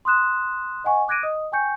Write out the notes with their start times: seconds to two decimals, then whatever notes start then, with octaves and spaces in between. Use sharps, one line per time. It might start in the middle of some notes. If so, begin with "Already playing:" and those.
0.05 C6 D#6 F#6 E7
0.84 D#5 F#5 G#5 C#6
1.08 D6 F#6 G#6 A#6 D7 D#7
1.23 D#5 D#6
1.52 G5 G#5 C#6 G6 C#7